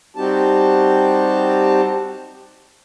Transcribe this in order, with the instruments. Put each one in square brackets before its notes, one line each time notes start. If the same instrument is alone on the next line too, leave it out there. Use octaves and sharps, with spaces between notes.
[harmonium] G3 C4 D#4 F#4 G4 A5